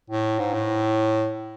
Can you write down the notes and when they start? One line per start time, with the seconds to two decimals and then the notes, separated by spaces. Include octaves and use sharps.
0.10 A2
0.39 G#2
0.53 A2